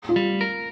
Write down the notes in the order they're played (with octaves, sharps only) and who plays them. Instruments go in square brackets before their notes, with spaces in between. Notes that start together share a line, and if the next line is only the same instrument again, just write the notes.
[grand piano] F4
[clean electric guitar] G3
A#4